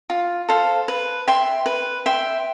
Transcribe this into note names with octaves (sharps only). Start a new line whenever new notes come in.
F4
A4 C5 F5
B4
E5 G5 C6
B4
E5 G5 C6